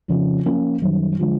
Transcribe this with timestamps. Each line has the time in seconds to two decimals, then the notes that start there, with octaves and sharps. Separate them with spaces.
0.08 F2 C#3 F3
0.45 F3 A#3 C#4 F4
0.82 F#2 D#3 G3
1.19 D3 F3 G#3